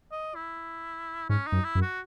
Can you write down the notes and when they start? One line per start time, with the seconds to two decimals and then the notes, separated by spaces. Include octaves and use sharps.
0.12 D#5
0.35 E4
1.29 G#2 C#4
1.47 D#4
1.52 F#2
1.64 E4
1.75 F#2
1.82 F#4